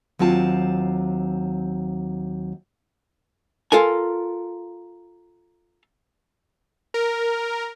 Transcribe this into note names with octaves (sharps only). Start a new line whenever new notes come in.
D#2 F#3 C4 F4 A5
F4 A4 A#4 G#5
A#4